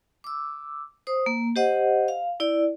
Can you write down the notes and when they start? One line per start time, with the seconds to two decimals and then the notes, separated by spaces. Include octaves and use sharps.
0.24 D6 E6
1.07 C5 D#6
1.26 A#3
1.56 G4 C5 D#5 F#5
2.08 F5
2.40 E4 D5